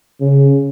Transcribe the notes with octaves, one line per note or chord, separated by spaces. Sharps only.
C#3